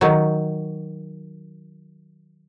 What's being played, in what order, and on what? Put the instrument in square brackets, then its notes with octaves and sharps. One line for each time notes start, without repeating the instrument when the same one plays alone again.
[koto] D#3 F#3